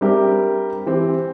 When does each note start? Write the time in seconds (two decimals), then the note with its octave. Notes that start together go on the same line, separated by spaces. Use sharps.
0.01 G3 C4 D4 G4 A#4 E5
0.87 E3 C4 G4